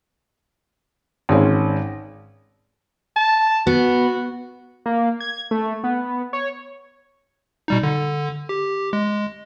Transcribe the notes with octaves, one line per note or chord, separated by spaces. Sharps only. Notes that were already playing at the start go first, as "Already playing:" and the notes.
G#1 G#3 C#4
A5
B3 F#4
A#3
G#6
A3
B3
C#5
B2 G3 D#4
D3
G4
G#3